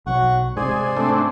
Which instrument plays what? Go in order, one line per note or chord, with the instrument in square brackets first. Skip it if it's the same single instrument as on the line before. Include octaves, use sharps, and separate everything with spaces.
[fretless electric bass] B1 B2 F#3 [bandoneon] F#5 C#6
[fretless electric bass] G#2 C3 [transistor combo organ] G#4 [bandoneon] C5 D5 G#5
[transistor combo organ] A3 C4 D4